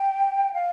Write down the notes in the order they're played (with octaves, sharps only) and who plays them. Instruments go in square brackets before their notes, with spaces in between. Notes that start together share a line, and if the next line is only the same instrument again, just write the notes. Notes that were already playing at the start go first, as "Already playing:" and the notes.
Already playing: [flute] G5
F5